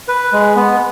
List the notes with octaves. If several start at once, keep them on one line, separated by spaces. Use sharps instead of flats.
B4
G#3
B3